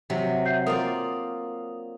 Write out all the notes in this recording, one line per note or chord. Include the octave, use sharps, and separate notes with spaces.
C3 F#3
E5 G6 C7
A#3 F4 D5 D#6